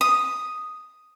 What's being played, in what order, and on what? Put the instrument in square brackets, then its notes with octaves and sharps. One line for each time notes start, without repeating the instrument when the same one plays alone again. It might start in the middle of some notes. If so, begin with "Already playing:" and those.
[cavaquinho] D#6